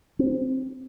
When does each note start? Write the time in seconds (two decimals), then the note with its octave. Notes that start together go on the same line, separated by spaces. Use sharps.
0.19 C4